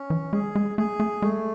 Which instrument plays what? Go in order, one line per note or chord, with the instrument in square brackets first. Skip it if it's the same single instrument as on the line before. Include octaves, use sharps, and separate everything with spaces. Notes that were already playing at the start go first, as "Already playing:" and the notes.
Already playing: [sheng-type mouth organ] C#4
[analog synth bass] E3
[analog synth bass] G#3 [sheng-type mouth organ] G#4
[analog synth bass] G#3
[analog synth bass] A3 [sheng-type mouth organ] G#4
[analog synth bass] A3
[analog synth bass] G#3 [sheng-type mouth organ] A3